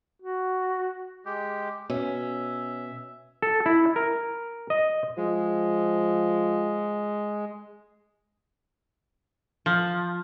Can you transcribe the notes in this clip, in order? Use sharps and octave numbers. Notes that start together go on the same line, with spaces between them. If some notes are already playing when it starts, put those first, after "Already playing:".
F#4
G#3 G4
B2 C#4 E5
A4
E4
A#4
D#5
F3 G#3
F3